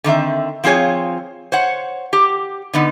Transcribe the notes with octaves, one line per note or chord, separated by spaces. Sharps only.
D3 D#3 C4 E5
F3 C4 F4 G#4 C#5
C5 C#5 F#5
G4
D3 B3 D#4